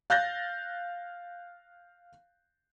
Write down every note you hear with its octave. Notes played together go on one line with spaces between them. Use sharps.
F5 F#6 G6 A6 A#6